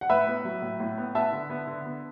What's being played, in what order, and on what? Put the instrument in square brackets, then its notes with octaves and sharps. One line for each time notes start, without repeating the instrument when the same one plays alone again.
[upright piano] F#5
A2 B4 E5
B3
F#3
A2
A2
B3
B3 E5 A5
D3
B3
D3
B3